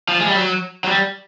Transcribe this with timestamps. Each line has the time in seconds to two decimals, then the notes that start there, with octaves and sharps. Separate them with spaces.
0.09 F3
0.20 G#3
0.28 G3
0.35 F#3
0.84 F#3
0.88 G3